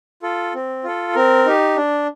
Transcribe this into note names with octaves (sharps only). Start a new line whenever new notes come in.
F4 A4
C4
F4 A4
C4 A#4
D#4 G4
D4